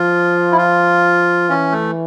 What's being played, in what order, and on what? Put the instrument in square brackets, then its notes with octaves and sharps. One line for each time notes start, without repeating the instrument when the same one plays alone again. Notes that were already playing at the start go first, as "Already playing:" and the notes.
Already playing: [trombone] F3 [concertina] F4
[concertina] E4
F4
[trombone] E3 [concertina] C#4
[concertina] A3